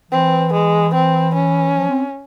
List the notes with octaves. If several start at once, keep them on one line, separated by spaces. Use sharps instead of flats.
E3 C4
G#3
C4
C#4
F3
C4